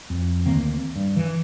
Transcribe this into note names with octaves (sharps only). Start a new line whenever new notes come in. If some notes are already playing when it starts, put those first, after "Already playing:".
F2
D2 D#3 A#3 C4
G2
E3